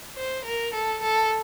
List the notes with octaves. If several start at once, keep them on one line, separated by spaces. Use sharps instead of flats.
C5
A#4
A4
A4